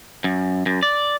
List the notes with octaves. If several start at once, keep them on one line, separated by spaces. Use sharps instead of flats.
F#2
F#2
D5